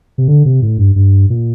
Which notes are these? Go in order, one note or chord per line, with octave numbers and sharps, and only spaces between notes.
C3
D3
C3
A2
G2
G2
A#2